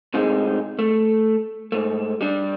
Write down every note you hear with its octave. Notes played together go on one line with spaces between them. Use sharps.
A2 C3 G#3 C4 D#4 G#4
A3
G#2 A3
G3 D4